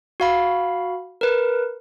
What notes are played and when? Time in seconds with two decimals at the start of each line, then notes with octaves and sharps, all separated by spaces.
0.20 F#4 F5 B5
1.21 A#4 B4